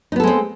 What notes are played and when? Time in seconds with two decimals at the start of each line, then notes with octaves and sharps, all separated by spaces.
0.12 D#4
0.16 B3
0.20 A4
0.24 G#3
0.27 C4